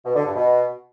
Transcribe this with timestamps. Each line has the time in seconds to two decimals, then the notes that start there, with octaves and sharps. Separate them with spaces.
0.04 B2
0.15 D3
0.25 G2
0.35 B2